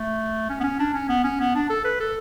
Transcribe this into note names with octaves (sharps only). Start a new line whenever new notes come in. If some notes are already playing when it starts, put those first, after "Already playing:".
Already playing: A3
C#4
B3
C#4
D4
C#4
B3
C#4
B3
D4
A4
B4
A4